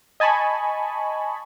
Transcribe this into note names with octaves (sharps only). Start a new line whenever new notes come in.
D#5 G#5 A5 B5 C#6